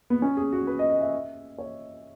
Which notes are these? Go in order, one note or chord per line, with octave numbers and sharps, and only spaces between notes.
B3
C#4
G#4
F#4
B4
D#5
D#5
E5
C#5